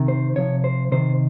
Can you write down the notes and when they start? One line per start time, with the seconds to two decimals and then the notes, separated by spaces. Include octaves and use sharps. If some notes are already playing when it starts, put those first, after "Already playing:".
Already playing: C3 D#3
0.08 C5
0.36 C3 F3 C#5
0.64 C5
0.92 C3 D#3 C5